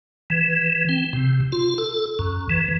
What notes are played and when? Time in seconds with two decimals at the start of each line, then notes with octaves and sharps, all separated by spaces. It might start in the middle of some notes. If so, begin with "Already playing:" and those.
0.30 E3
0.89 C4
1.13 C3
1.52 F4
1.78 A4
2.19 F#2
2.49 E3